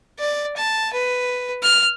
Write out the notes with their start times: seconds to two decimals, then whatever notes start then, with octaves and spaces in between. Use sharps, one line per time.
0.19 D5
0.56 A5
0.93 B4
1.63 F6